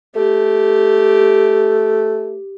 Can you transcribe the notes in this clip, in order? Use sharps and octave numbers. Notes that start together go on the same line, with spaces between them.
A3 G4